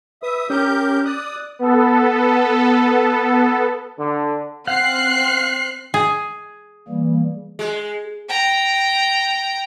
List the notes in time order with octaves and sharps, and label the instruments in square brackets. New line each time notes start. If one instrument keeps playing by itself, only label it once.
[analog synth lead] B4 [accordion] E5 D#6
[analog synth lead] C#4 [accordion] G4 A#4 G6
[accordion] D5 D#6 [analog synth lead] F#6
[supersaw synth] B3 A4
[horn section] D3
[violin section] C4 F#6 C7 [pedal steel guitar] F5 F#5
[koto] G#4
[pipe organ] E3 G3 A#3
[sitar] G#3
[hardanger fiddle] G5 A#5